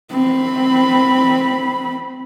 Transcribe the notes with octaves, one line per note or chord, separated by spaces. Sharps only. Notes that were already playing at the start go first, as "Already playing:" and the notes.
C4 B5